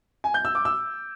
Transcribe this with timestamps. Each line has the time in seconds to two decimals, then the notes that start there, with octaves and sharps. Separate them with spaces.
0.24 G#5
0.34 G6
0.45 E6
0.55 D6
0.65 E6